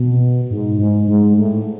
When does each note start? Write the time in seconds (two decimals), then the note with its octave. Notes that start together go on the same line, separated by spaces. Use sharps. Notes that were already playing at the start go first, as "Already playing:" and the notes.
Already playing: B2
0.50 G#2
0.78 G#2
1.07 G#2
1.37 A2